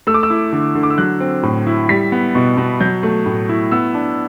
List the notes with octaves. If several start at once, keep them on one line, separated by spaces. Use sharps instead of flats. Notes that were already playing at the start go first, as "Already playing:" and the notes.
A3 E6
D6
E6
E4
D3
D3
D6
E6
F#3 F#6
C4
A2
E4
G3 B6
B3
B2
B2
F#3 G6
A3
A2
E4
B3 E6
D4